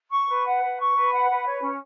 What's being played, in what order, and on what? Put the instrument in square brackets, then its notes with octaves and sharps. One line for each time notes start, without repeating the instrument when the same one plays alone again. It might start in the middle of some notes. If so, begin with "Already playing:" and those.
[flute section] C#6
B4
F#5
B4
C#6
B4
F#5
B4
C#5
C#4